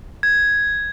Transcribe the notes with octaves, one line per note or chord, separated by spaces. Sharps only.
G#6